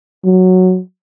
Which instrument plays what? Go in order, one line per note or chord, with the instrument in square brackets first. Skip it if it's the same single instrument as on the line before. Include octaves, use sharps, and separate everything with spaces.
[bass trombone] F#3